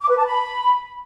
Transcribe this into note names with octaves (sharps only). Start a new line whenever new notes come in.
D6
B4
A5
B5